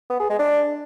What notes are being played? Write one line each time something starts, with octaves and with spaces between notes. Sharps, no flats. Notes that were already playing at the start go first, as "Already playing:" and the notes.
B3
G#4
G#3
D4